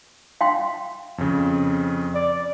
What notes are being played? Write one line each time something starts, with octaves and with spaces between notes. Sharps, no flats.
F5 G5 C6
F2 C#3
D5